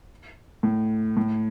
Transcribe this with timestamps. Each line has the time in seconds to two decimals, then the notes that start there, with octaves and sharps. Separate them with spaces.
0.63 A2
1.17 A2